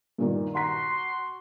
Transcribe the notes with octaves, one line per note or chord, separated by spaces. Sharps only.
G2 A#2 D#3
F#4 F#5 A#5 C6 B6